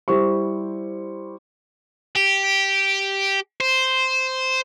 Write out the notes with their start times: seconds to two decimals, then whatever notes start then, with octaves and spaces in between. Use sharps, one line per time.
0.08 G3 E4 G4 C5 C#6
2.16 G4
3.60 C5